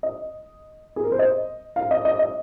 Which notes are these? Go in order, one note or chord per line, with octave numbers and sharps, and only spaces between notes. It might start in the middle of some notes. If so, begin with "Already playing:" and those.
D#5
G#4
A#4
C5
D#5
F5
D#5
D#5
D#5